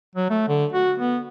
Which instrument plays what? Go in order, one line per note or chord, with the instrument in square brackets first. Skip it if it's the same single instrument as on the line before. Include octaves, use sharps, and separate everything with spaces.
[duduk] F#3
A3
D3
F#4
B3